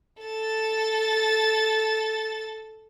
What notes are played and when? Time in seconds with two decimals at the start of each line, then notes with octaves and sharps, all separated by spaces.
0.22 A4 A6